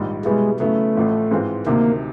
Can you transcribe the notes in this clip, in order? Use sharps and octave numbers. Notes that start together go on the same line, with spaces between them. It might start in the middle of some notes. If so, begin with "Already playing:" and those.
Already playing: A#1 G#2 D#3 G3
B2 G3 G#3 B3 E4
C#3 F#3 A3 B3 E4
A1 A2 F3
G#2 E3 G#3 C4 F4
D2 C3 D#3 A#3